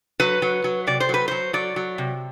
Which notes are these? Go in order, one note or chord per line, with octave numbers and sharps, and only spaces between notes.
F#3 B4
F#3
F#3
C3 D5
C5
F#3 B4
F#3 C5
F#3 D5
F#3
C3